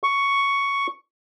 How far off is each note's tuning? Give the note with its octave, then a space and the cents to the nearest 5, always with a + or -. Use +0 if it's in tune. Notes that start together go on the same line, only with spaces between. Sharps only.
C#6 +5